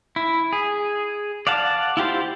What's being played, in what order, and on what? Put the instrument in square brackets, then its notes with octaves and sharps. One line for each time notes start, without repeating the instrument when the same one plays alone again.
[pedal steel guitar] E4
G#4
D5 F5 F#5 A5
E4 F4 G4 C5